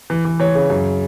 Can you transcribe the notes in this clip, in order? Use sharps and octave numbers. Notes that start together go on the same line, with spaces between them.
E3
E3
E3 C#5
C#3
F#2